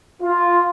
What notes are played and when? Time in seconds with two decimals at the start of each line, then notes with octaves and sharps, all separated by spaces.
0.22 F4